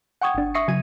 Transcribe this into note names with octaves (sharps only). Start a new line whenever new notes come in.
F#5 G5 C#6 D#6 G#6
G1 D4
E5 C#6 D#6 A#6 C7 C#7
C#3 F#3 G#6 D#7